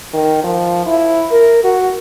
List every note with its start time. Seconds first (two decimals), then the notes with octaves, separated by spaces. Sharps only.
0.14 D#3
0.44 F3
0.86 E4
1.31 A#4
1.64 F#4